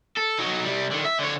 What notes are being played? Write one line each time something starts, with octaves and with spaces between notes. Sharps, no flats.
A4
F#3 D#4
C3 G3
D3 D#3
E5
D3 C#5